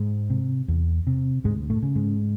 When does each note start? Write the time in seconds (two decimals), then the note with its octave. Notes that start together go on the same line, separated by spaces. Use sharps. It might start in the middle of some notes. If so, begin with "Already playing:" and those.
Already playing: G#2 G#3
0.30 C3
0.68 E2
1.07 C3
1.44 D2 G#2 G#3
1.70 A2 A3
1.82 C#3
1.95 G#2 G#3